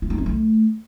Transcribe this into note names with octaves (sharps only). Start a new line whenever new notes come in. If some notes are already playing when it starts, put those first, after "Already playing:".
E4
D#4
C4
A3